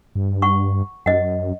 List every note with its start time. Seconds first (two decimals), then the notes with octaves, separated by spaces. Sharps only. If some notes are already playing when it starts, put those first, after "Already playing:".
0.15 G2
0.42 F#5 C#6
1.06 F#2 D#5 F#5